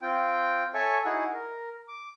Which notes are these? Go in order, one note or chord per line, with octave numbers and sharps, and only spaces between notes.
C4 F4 G5
A4 C#5 E5 G#5 A5 C#6
D#4 E4 F#4 G#4 F#5
A#4
D6